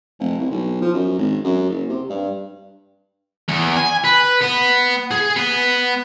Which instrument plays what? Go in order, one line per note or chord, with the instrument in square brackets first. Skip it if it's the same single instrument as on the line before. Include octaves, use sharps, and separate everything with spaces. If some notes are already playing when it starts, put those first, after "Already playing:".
[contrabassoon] F1
C2
B1
F3
F#2
G#1
F#2
F#1
C3
G2
[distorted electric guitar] E2
G#5
B4
B3
G#4
B3